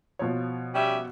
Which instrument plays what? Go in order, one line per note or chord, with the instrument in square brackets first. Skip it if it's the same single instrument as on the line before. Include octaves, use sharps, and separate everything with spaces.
[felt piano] B2 F3 C#5
[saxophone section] G3 C#4 E5